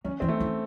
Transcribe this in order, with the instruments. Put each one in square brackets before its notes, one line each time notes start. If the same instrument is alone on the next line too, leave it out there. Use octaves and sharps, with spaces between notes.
[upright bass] F#3 [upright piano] C#4
[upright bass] E3 [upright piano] C4
[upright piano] A3
[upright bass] E3